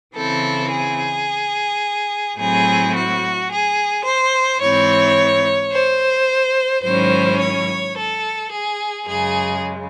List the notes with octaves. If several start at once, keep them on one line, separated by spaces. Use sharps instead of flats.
C#3 E3 C4 E4 A4
G#4
A2 F#3 A3 C4 E4 G#4
F#4
G#4
C5
G#2 E3 C4 E4 C#5
C5
G#2 D#3 F#3 C#4 E4 C5
C#5
A4
G#4
F#2 C#3 G#3 G#4